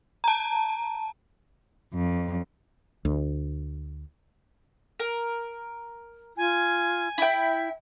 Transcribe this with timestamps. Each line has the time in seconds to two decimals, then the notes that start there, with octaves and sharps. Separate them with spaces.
0.24 A5 A#5
1.94 F2
3.05 D2
5.00 A#4
6.37 F4 G#5
7.18 E4 E5 G5